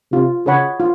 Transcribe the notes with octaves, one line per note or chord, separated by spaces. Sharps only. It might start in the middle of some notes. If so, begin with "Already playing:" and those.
C3 F4
C#3 G#4 C#5 F#5 B5
F4